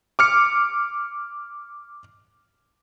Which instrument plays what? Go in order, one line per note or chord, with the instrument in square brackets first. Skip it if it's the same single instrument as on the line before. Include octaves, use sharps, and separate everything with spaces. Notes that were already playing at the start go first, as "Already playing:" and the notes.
[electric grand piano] D6 F6 C#7